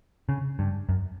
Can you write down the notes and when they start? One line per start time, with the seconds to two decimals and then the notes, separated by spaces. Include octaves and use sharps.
0.29 C#3
0.59 G2
0.89 F#2